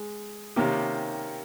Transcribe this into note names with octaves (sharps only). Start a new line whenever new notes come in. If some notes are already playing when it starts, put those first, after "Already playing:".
Already playing: G#3 G#4
C3 D#3 A#3 C#4 G4